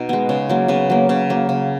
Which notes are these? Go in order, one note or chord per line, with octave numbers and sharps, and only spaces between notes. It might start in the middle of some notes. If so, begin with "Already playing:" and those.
Already playing: B2 D#4
G#3 B3
C#3
F#3 A#3
C#3 B3
F#3 A#3
C#3
F#3 A#3
C#3